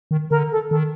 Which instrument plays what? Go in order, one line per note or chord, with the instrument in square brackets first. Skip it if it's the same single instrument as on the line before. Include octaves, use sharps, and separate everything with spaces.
[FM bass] D#3
[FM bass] D3 [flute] A#4
[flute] A4
[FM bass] D#3 [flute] A4